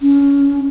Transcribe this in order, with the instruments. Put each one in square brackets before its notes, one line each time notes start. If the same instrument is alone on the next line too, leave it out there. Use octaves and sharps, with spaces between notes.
[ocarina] C#4